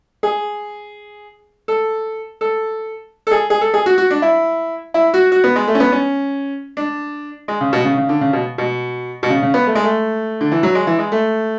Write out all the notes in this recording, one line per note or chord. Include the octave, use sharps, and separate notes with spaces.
G#4
A4
A4
A4
G#4
G#4
A4
G#4
F#4
F#4
D4
E4
E4
F#4
F#4
B3
G#3
A3
C#4
B3
C#4
D4
G#3
C#3
B2
C#3
C#3
D3
C#3
B2
B2
B2
C#3
C#3
B3
A3
G#3
A3
D3
E3
F#3
G#3
E3
G#3
A3